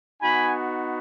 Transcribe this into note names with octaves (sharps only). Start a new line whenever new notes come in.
B3 D#4 F#4 G#5 B5